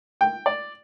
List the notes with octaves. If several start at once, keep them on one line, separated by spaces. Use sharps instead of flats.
G5
D5